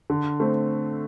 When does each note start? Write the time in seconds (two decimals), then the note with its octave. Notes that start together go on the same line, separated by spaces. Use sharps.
0.10 D3
0.40 A3 C4